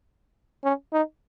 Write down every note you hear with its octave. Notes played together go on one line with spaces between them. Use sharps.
C#4
D#4